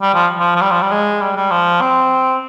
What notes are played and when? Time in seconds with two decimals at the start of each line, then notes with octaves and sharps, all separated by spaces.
0.02 G3
0.14 F3
0.39 F3
0.56 F3
0.61 G3
0.71 F3
0.82 G3
0.91 G#3
1.21 G3
1.36 G3
1.51 F3
1.81 C4